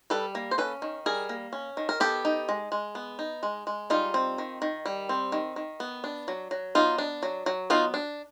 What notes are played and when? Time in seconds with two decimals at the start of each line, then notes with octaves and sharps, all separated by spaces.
0.10 G3 A4 B4
0.35 A#3
0.51 C5
0.58 C#4 A4 B4
0.82 D#3
1.06 G3 G#4 A#4
1.29 A#3
1.53 C#4
1.77 D#3
1.89 A#4
2.00 B3 G4 A4
2.25 D#4
2.49 G#3
2.72 G#3
2.95 B3
3.19 D#4
3.43 G#3
3.67 G#3
3.90 G3 D#4 F4
4.14 C4
4.38 D#3
4.62 D#3
4.86 G3
5.09 C4
5.32 D#3
5.56 D#3
5.80 B3
6.04 D4
6.28 F#3
6.51 F#3
6.75 B3 D#4 F4
6.98 D4
7.23 F#3
7.46 F#3
7.70 B3 D#4 F4
7.94 D4